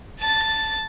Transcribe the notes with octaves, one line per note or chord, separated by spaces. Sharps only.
A5 A6